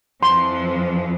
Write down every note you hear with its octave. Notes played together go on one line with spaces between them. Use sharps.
F2 E3 F3 C6